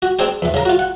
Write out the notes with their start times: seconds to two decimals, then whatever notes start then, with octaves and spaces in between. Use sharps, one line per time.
0.02 F#4
0.19 C4 D4 G#4 C5 G5
0.42 E2 E3
0.54 C#3 A#4
0.65 F4 F#4
0.79 F#5